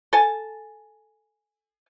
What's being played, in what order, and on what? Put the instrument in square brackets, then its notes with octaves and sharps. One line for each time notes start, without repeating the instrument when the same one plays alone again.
[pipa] A4 G#5 A5